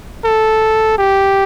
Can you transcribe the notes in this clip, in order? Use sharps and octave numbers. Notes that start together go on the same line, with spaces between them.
A4
G4